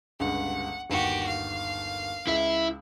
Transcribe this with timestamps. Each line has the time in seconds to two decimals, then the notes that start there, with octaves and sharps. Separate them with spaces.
0.20 G1 C#2 G2 F#5
0.90 G1 D#2 F#4 G4
1.27 F5
2.27 C#2 E4 E5